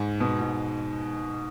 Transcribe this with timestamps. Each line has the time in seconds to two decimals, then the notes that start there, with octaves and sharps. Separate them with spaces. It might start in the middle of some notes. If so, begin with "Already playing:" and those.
Already playing: G#2
0.20 B2
0.41 G#2